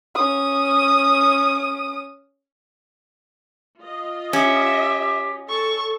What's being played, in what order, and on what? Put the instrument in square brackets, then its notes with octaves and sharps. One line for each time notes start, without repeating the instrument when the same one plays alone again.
[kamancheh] C#4 D#6
[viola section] F4 D#5
[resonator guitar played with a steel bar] C#4 [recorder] G4 [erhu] E5
[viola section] A4 [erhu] C#6